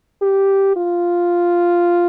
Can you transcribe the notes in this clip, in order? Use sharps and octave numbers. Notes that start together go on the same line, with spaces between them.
G4
F4